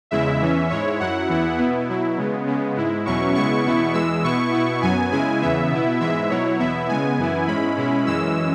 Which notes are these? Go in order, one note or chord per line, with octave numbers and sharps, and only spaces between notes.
E2 C#3 G#3 E4 E5
E2 E3 C#4
G#2 G#3 E4 C#5
F#2 F#3 E4 F#5
E2 E3 B3 E4
B2 B3 E4
B2 F#3 E4
C#3 G#3 B3
C#3 G#3 B3
G#2 G#3 E4
E2 B2 F#3 C#4 E4 C#6
C#3 G#3 B3 E4 C#6
E2 B2 B3 E4
E2 E3 G#3 E6
B2 B3 E4 C#6
B2 B3 E4
F#2 F#3 B3 G#5
C#3 G#3 E4 G#5
E2 C#3 E3 B3 E5
B2 B3 E4
G#2 E3 G#3 E4 E5
B2 F#3 E4 C#5
E2 B2 B3 E4 E5
C#3 G#3 B3 G#5
F#2 E3 B3 E4
G#2 G#3 C#4 E4 B5
B2 G#3 C#4 E4
F#2 E3 G#3 C#4 E6